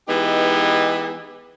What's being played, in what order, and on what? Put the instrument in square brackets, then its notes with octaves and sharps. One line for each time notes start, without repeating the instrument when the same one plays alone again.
[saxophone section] E3 G#3 B3 D#4 G4